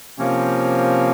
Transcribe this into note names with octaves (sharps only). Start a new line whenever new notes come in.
C3 F3 A#3 C#4